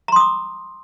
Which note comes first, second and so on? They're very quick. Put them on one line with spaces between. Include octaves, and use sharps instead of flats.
A#5 C6 D#6 D6